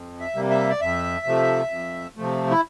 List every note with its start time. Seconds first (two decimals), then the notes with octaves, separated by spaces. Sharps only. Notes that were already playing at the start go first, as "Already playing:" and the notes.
Already playing: F2
0.20 E5
0.35 C3 G3 A#3
0.50 E5
0.69 D5
0.81 F2 E5
1.26 C3 F3 A3
1.70 F2
2.17 C3 F3 A3
2.51 E4